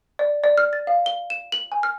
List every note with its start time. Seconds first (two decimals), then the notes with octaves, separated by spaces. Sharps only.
0.19 D5
0.44 D5
0.58 F6
0.73 A6
0.87 F5
1.06 G7
1.30 E7
1.52 F#7
1.72 G#5
1.83 F6